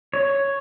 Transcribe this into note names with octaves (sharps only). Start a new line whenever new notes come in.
C#5